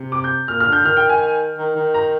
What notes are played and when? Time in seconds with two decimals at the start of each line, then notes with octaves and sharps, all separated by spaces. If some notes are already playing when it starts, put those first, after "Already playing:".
Already playing: C3
0.12 D6
0.24 G6
0.48 A#2 F6
0.60 F6
0.67 D3
0.73 G6
0.85 D#3 F6
0.97 G5
1.09 G#5
1.58 D#3
1.76 D#3
1.94 A#5